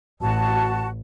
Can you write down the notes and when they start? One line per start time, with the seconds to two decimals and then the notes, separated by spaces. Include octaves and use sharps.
0.21 A1 F#4 A5